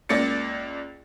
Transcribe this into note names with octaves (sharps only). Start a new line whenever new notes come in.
C#2 A#3 D5 A6 C#7